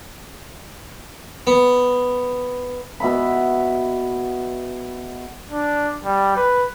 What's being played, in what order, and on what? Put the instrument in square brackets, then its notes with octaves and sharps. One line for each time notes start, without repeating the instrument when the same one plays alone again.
[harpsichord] B3
[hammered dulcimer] B2 E5 B5
[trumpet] D4
G3
B4